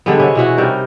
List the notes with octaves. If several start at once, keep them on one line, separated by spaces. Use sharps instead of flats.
D3 G3 G#3 B3
C3 C#4
B2 E3 F#4
C3 G3 D#4 A#4